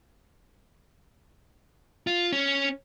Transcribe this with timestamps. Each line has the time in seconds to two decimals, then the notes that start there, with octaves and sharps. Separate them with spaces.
2.07 F4
2.32 C#4